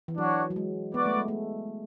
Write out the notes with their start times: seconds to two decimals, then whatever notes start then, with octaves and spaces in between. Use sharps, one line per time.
0.08 E3
0.18 F#3 D4 F#4 C#5
0.50 F#3
0.56 G#3
0.94 B3 F#4 B4 D5
1.06 A3
1.17 G#3
1.28 A3